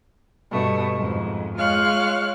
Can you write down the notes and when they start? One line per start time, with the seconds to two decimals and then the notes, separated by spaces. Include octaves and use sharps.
0.51 G2 B2 A3
0.95 F2 G#2
1.57 G#3 F4 C#5 F5 F6 F#6